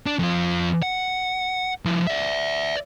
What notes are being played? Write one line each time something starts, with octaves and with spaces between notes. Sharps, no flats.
D4
F2 F4
F#5
F3 E4
D5 E5